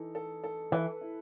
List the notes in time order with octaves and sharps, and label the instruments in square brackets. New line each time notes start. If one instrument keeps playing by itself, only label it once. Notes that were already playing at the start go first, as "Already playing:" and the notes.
Already playing: [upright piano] E3 D#4 A4
A4
A4
[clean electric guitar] E3 [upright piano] B4
[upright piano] E4